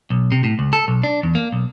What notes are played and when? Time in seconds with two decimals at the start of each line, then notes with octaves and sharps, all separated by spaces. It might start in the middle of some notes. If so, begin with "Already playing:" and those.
0.10 B1
0.32 C3
0.44 A2
0.59 C#2
0.73 A4
0.88 B1
1.03 D4
1.23 E2
1.35 A#3
1.52 B1